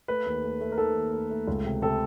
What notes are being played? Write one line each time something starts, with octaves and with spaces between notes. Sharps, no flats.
A3 B4
D#2
A3
A3
A#4
D#3 A4
D#2
A3
A3
C#2
C3
C3 A4